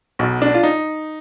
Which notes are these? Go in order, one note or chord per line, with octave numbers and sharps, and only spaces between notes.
B1 B2
D4
F4
D#4